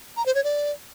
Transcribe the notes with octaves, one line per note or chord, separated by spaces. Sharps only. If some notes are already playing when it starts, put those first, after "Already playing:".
A#5
C5
C#5
D5